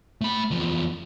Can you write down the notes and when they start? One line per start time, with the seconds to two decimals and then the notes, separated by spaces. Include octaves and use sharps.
0.21 A3 B5
0.51 E2 F3